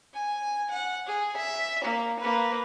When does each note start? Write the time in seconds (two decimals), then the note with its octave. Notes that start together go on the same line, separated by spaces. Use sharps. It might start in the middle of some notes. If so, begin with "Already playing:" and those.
0.13 G#5
0.70 F#5
1.06 G#4
1.36 E5
1.84 A#3
2.19 A#3 B4